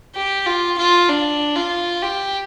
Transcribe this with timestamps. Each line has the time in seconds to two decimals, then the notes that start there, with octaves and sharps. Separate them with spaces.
0.15 G4
0.46 F4
0.78 F4
1.09 D4
1.56 F4
2.03 G4